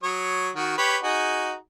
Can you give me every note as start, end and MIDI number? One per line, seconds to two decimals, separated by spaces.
0.03 0.50 54
0.03 0.50 73
0.03 0.50 87
0.56 0.74 51
0.56 0.74 66
0.78 0.97 67
0.78 0.97 71
0.78 0.97 73
1.03 1.54 63
1.03 1.54 66
1.03 1.54 68